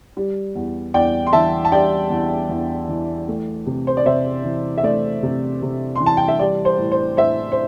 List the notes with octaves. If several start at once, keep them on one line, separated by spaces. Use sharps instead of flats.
G3
E2
E2 D5 G5
C6
E3 E5 A5
A5
G3 D5 G5
E2
E2
E3
A3
C3
C5
D5
C3 C5 E5
E3
E5
A3 D5
C3
C3
E3 C6
A5
G5
E5
G3 D5
C5
A2
C5
A2 C5 E5
C5